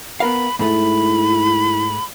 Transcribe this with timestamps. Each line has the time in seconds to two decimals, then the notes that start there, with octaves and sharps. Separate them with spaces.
0.20 B3 A#4 F5 B5
0.59 G#2 G#3 A3 E4 B5